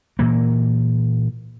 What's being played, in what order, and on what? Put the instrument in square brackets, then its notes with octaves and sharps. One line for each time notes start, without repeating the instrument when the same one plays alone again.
[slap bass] A#2 E3 A#3